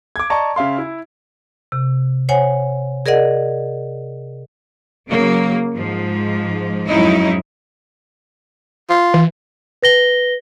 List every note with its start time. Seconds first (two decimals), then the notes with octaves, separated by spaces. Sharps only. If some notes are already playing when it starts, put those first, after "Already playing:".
0.16 D6 G#6
0.30 D5 D#5 A5 A#5 C#6
0.56 C#3 E5 F5 C6
0.78 E4
1.72 C3
2.29 C5 C#5 F#5 G#5
3.06 G#4 A#4 D5 D#5 F#5
5.10 C#3 F#3 A#3
5.73 G#2 F3
6.89 F2 G#2 F#3 C#4 D#4 E4
8.90 F4
9.14 E3
9.82 B4 A#6 G7